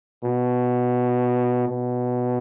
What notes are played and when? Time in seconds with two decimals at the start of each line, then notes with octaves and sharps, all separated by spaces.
0.24 B2
1.68 B2